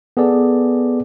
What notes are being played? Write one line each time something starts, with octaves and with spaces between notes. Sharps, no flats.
B3 G#4 A4 D5